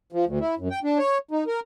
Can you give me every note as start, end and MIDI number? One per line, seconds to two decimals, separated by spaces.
0.12 0.25 53
0.26 0.39 38
0.40 0.55 64
0.58 0.68 42
0.71 0.79 79
0.83 0.98 62
0.98 1.18 73
1.31 1.44 63
1.47 1.60 70